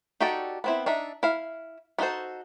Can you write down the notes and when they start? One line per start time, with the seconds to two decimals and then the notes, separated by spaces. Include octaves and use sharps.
0.20 D#4 F#4 G4 A4 D5
0.64 B3 C4 E4
0.86 D4 D#4 E5
1.23 E4 F5
1.98 B3 D#4 F#4 A4 C5